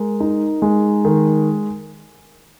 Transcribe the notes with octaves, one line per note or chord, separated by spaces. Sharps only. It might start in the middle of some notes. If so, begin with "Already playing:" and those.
Already playing: G#3 A#4
D#4
G#3
D#3